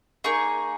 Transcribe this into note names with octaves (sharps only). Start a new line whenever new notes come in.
A#3 D#4 G#4 C#6